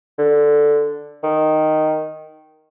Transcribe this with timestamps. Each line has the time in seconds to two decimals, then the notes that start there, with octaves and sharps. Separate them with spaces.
0.18 D3
1.23 D#3